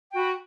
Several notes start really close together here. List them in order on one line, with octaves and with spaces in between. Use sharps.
G5 F#4 B5